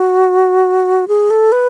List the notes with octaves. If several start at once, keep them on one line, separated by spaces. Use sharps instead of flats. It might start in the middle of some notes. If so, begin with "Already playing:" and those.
Already playing: F#4
G#4
A4
B4